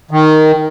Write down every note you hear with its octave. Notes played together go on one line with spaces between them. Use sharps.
D#3